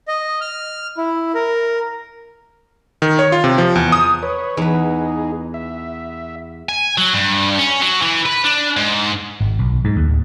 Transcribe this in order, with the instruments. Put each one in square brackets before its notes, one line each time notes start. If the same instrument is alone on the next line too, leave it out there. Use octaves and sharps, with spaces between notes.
[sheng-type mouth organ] D#5
F6
E4
A#4
[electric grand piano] D#3
C#5
F4
C3
F3
E2
D#6
[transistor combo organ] B4 C#5
[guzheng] E2 B4 [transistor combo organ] D#4 G#4
[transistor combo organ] E5
[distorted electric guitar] G#5
F#3
G2
C#4
F#3
E3
B4
D4
G#2
[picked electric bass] G#1
B1
G#2
D#2
D1